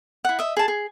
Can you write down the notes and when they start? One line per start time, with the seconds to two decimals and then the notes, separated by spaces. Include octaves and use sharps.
0.25 E4 F#5
0.39 D#5 E5
0.57 G#4 A5
0.68 G#4